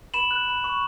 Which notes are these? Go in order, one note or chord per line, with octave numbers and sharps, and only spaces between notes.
B5 E7 F#7
F#6
B5
C#6